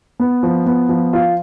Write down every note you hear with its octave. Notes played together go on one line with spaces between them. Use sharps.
B3
F3
B3
F3
F4